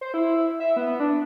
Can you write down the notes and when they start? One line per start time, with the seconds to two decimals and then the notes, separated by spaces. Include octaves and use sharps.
0.01 C5
0.14 E4
0.60 E5
0.76 B3
1.00 D4